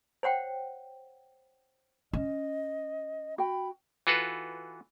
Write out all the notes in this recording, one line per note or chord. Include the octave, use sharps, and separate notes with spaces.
C5 C#5 F#5 G5
C#4 D#5
F#4 G5 B5
E3 F4 F#4 A4 B4